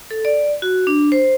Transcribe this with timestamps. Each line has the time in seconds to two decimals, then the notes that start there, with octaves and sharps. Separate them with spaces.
0.11 A4
0.25 D5
0.62 F#4
0.87 D4
1.12 C5